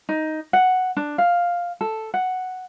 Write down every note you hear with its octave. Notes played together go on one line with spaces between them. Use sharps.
D#4
F#5
D4
F5
A4
F#5